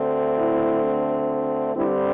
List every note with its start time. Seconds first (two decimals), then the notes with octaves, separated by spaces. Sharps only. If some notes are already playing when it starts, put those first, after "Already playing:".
Already playing: D2 D3 A3 C4
0.38 E4
1.74 G2 D3 G3 C4 E4